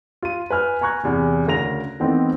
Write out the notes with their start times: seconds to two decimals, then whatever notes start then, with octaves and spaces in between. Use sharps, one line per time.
0.23 F4 D#7
0.50 B4 G#5 F6
0.81 G#5 A#5 C#6 F#6 G#6
1.03 E2 C3
1.46 D2 C#3 A#4 A#6 F7
2.00 D#3 E3 A3 B3 C4 D#4